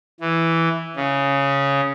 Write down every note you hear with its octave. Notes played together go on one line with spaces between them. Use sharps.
E3
C#3